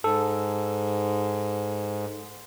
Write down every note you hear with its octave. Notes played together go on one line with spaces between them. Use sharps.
G#2 A4